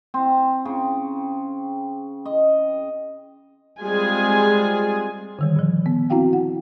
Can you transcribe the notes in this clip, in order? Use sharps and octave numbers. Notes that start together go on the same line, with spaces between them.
C4
C#3
D#5
G3 G#3 C4 F4 G#4 G#5
D3 D#3 G3
A#2 F3
B3
C4 E4 F#4 F5 G5
F#5